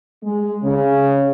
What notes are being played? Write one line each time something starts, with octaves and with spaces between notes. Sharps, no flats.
G#3
C#3